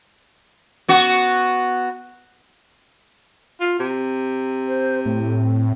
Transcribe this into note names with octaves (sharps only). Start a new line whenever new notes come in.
B3 F#4
F4
C3
C5
A2 C4